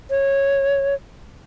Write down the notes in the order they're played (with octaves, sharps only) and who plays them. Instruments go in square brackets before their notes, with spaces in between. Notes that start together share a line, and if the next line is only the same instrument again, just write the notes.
[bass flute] C#5